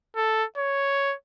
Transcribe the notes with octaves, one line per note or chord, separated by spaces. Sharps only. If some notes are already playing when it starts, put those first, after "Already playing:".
A4
C#5